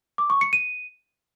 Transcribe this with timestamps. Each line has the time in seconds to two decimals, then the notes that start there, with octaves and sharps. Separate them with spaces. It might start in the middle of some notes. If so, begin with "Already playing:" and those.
0.18 D6
0.30 C#6
0.41 C#7
0.53 D#7